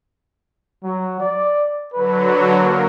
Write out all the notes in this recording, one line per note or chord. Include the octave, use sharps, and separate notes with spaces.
F#3
D5
D3 F#3 B4
A#3 A#4